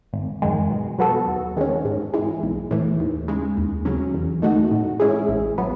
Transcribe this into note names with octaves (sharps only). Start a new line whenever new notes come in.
G#1
F#2 D#3 G#3
B2
F#3 B3 F#4 A4
D#2
D#3 G#3 C#4
G#2
E3 G#3
B1
A2 E3
D#2
C#3 G#3
D#2
C#3 F#3 C#4
E2
D#3 A3 D#4 F#4
A2
G#3 C#4 E4 G#4
A1
F#3 B3